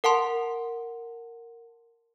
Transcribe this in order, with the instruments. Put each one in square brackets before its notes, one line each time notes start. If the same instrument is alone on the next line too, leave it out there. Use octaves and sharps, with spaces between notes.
[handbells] A#4 F#5 A5 C6